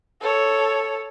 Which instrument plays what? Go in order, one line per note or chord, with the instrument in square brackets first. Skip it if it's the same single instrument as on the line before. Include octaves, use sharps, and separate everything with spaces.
[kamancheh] A4 C#5